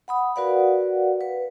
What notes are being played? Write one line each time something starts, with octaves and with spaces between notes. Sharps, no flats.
F#5 B5 D#6
F#4 A#4 B4 D5 F5 F#5
B4